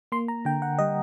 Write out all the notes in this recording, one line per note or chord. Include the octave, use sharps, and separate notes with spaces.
A#3 C6
A#5
D3 G5
F#5
G3 D#5